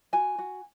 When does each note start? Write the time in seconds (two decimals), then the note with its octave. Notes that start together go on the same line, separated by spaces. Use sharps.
0.13 F#4 G#5
0.38 F#4